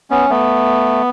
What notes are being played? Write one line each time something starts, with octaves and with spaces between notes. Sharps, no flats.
B3 C#4
A3 B3